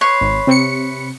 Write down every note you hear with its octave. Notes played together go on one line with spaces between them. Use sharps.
B4 C#5 C6
G#1
C3 C#7